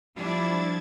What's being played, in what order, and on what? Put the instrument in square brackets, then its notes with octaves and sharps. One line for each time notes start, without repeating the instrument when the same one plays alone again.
[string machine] F3 G#6 A6 [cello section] G3 D4 E4